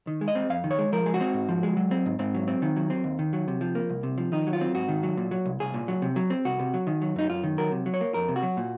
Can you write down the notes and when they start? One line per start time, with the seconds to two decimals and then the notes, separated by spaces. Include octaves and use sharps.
0.07 D#3
0.21 G#3
0.28 D#5
0.35 C4
0.50 F2 F5
0.64 D#3
0.71 C#5
0.79 G#3
0.92 F3 A#4
1.06 G#3
1.14 F#4
1.21 C4
1.34 G#2
1.49 F3
1.63 G#3
1.77 F#3
1.91 C4
2.06 G#2
2.19 G#2 C4
2.34 F#3
2.48 C4
2.62 D#3
2.76 F#3
2.90 C4
3.04 D#2
3.19 D#3
3.33 F#3
3.48 C3
3.61 F3
3.75 A#3
3.89 C2
4.03 C3
4.18 F3
4.32 D#3 D#4
4.47 F#3
4.53 F4
4.61 C4
4.75 G#2 F#4
4.88 D#3
5.03 F#3
5.17 A#2
5.31 F#3
5.46 C2
5.60 C2 G#4
5.74 A#2
5.88 F#3
6.02 C3
6.16 F#3
6.30 C4
6.45 C2 F#4
6.60 C3
6.74 F#3
6.87 D#3
7.02 F#3
7.16 F#2 D#4
7.30 F#2 F4
7.43 D#3
7.58 F#3 A#4
7.72 C3
7.86 F#3
7.94 C#5
8.01 A#3
8.14 F2 A#4
8.28 C3
8.36 F#4
8.43 F#3
8.57 A#2